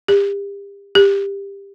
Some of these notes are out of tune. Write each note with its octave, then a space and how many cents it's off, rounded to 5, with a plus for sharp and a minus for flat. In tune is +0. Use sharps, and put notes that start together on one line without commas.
G4 +35
G4 +20